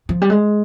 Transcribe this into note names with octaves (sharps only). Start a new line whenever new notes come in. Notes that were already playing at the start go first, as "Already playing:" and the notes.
F3
G3
G#3